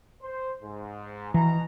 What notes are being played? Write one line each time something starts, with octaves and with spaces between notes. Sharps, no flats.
C5
G#2
B2 E3 A#5